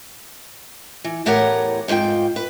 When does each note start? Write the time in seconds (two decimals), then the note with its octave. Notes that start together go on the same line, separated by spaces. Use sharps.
1.04 E3
1.26 E2 A2 G4 A#4 C#5 F#5
1.88 F2 G#2 F3 F4 G5
2.36 B4